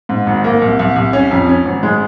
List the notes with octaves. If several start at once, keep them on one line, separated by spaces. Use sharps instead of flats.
G#2
G#1
A#3
C2
C2
C2
C#4
F2
C#4
G#1
G#3